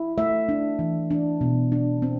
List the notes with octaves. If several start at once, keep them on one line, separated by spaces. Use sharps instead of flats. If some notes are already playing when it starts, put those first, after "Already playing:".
Already playing: E4
A3 E5
D4
E3
D4
B2
D4
C4